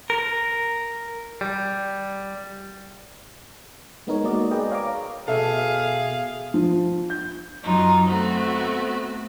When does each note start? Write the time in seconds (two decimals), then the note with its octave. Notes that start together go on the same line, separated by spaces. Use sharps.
0.10 A#4
1.41 G3
4.07 G#3 B3 D#4 A#4 C#5
4.24 G#3 A#3 F#4 A#4 D5 D#5
4.51 G#4 A#4 B4 D5 D#5 G5
4.70 C#5 F5 A#5 D6
5.28 B2 G#4 A4 E5 F5
6.54 F3
7.10 G6
7.62 F#2 F#3 D#4 F4
8.07 A3 B3 C4 F#4